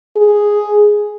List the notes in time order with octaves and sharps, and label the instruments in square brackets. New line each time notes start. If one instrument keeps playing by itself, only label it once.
[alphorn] G#4